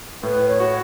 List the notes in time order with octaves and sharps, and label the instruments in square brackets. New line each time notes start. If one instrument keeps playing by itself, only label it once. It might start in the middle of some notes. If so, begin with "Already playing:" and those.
[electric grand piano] A2 [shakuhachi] B4
[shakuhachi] C#5
[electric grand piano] F#4